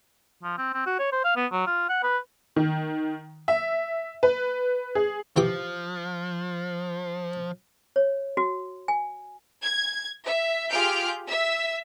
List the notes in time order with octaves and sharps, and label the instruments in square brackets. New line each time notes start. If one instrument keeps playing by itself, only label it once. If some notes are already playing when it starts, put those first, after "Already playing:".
[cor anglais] F3
C4
C4
F#4
C#5
C5
F5
B3
F#3
F4
F#5
B4
[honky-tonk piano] D#3
E5
B4
G#4
[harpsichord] E3 G4 D6 [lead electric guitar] F3
[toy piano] C#5
F#4
G#5
[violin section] G#6
E5
F4 G4 G#4 F6 G6 D7
E5 E6